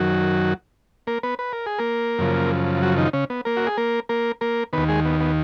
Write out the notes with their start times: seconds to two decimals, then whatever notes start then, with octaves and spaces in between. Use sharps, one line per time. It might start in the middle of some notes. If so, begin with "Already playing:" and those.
Already playing: F#2 D#3 F#3 F#4
1.07 A#3 A#4
1.23 B3 B4
1.39 B4
1.53 A#4
1.66 G#4
1.78 A#3 A#4
2.19 F#2 C#3 F3
2.82 F#3 F#4
2.98 D#3 D#4
3.13 C#3 C#4
3.30 B3
3.45 A#3 A#4
3.57 F#4
3.67 G#4
3.77 A#3 A#4
4.09 A#3 A#4
4.41 A#3 A#4
4.73 D#2 D#3 B3 B4
4.89 G#3 G#4
5.05 B3
5.21 B3